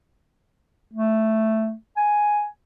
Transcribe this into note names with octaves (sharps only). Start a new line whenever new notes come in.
A3
G#5